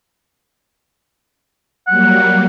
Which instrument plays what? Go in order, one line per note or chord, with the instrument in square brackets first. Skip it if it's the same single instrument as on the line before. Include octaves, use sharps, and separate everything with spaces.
[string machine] F#3 G3 A#3 [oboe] F#5